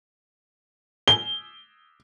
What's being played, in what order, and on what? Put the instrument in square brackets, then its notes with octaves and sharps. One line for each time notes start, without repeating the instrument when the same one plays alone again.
[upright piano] G7